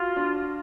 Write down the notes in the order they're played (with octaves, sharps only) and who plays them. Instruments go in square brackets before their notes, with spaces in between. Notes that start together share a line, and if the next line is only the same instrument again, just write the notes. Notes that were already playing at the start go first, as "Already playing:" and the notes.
Already playing: [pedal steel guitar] F4 [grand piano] F#4
[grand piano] D4